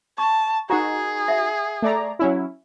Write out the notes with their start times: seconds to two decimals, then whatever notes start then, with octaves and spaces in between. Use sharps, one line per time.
0.18 A5 C#6
0.70 D#4 F#4 G#4 A#4 F#5 A#5
1.28 E5 F#5
1.82 A3 D5 A#5
2.19 F#3 C#4 E4